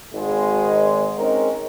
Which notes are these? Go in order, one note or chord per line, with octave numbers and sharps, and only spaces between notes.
G#1 G#3
G#3 C4 C#4 D#4 A#4